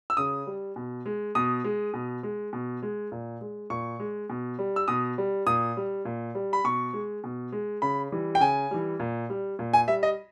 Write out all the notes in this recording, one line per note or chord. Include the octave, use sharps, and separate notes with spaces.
E6
C#3 D#6
G3
B2
G#3
B2 D#6
G#3
B2
G#3
B2
G#3
A#2
G#3
A#2 C#6
G#3
B2
G3
E6
B2 D#6
G3
A#2 D#6
G3
A#2
G3
B5
B2 C#6
G#3
B2
G#3
C#3 B5
E3 G3
G5
C#3 G#5
E3 G3
A#2
G3
A#2
G#5
G3 E5
D#5